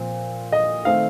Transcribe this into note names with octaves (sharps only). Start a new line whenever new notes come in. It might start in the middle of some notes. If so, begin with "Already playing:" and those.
Already playing: A#2 F3 C4
D#5
D#3 A3 C4 F5